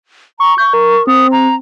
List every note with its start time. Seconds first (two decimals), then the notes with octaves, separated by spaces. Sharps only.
0.40 A#5 C#6
0.58 C#6 G6
0.73 A#4
1.07 C4 D#6
1.32 A#5